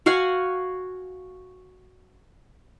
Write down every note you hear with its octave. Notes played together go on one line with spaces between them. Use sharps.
F#4 F5 F#5 G#5